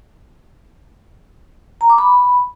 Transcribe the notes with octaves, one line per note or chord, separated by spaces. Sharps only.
A#5
D6
B5